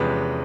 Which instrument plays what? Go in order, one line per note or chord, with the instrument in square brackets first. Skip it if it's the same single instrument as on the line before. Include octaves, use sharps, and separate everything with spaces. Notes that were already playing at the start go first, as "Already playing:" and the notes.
Already playing: [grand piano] E2 C3 F3 G#3 C#4 B4